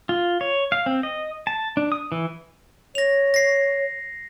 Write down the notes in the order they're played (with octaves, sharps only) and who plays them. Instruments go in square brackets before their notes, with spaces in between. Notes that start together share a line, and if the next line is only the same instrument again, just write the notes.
[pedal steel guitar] F4
C#5
F5
C4
D#5
A5
D4
D#6
E3
[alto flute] C#5 [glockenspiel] A#6 F7
[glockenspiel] A#6 C7